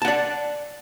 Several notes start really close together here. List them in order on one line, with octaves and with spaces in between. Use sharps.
A5 F#5 D5